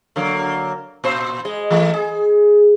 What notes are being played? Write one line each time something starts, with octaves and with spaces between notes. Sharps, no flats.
D3 F#3 A#3
A#2 C5
G#3 D#5
E3 G#3 A3
G#4